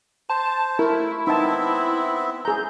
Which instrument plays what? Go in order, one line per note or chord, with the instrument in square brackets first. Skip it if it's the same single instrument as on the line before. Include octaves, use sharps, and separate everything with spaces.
[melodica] C5 [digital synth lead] A5
[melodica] A3 [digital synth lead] E4 [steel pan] A#4
[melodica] B3 C4 E5 [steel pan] D#4 A5
[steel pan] G#4 A#5 [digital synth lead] G6